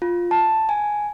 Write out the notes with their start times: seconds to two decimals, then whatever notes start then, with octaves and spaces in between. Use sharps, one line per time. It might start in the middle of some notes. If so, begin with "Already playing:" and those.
0.02 F4
0.31 A5
0.69 G#5